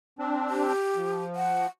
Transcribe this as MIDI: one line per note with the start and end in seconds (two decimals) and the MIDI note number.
0.19 0.72 60
0.19 0.72 62
0.49 1.22 67
0.96 1.67 53
1.36 1.66 78